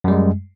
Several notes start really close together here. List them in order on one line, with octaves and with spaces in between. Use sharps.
F#2 G3 G#3